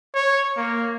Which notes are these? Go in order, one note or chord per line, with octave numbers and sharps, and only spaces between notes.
C#5
A#3